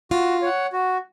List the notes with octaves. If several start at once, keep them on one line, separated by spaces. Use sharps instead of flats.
F4 F#4
C#5 F#5
F#4